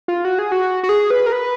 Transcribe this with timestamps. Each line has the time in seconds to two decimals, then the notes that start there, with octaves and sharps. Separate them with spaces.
0.08 F4
0.25 F#4
0.39 G#4
0.52 F#4
0.83 F#4
0.89 G#4
1.10 B4
1.26 A#4
1.32 B4